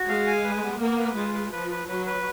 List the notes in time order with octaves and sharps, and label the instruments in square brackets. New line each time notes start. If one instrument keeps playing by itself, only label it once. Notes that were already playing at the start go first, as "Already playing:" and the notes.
Already playing: [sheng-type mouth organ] F#4
[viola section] G#3 [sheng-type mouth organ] F5
[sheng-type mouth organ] G#5
B4
B3
[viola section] A#3 [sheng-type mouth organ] B3
[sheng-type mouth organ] B4
[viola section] G#3 [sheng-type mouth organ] F4
[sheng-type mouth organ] B4
[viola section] F3 [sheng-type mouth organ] B4
[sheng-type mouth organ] B4
[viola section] F#3 [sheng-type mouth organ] B4
[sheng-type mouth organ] B4